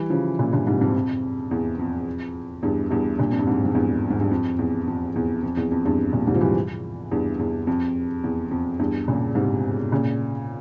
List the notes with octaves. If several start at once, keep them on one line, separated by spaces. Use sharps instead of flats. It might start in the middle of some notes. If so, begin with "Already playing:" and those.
Already playing: E3 G3
C#3 F3
A#2 C#3
G2 A#2
G#2 C3
F2 G#2
F2
E2
F2
E2 G2
E2 G2
G2 A#2
F2
G2
F2 G#2
G#2
E2 G2
G#2
G2
F2
E2
F2
E2
F2
E2
F2
E2 G2
G2 A#2
G#2 C3
F3
E3 G3
E2 G2
E2
F2
E2
F2
E2 G2
A#2 C#3
G#2 C3
A#2 C#3